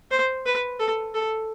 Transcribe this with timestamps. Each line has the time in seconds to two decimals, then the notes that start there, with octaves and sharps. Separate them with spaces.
0.11 C5
0.46 B4
0.79 A4
1.14 A4